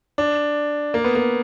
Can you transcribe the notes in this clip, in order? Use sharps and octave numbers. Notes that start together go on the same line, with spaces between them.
D4
A#3
B3
A#3